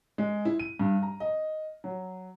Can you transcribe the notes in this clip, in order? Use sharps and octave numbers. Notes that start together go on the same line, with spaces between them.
G#3
E4
D#7
G2
A#5
D#5
F#3